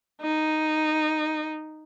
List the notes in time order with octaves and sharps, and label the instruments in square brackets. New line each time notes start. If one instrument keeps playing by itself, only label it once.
[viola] D#4